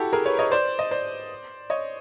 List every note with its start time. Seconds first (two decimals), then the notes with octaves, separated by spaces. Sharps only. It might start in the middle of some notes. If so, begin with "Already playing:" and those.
Already playing: E4 F#4 G4 A4
0.13 G#4 A#4
0.25 B4 C#5
0.39 C#5 D#5
0.52 C5 D5
0.79 D#5
0.91 C5 D5
1.70 C#5 D#5